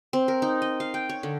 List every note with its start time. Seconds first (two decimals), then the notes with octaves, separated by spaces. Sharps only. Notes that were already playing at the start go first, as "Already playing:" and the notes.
0.13 C4
0.28 A#4
0.42 D#4
0.62 D#5
0.80 F5
0.94 G5
1.09 C#5
1.23 D3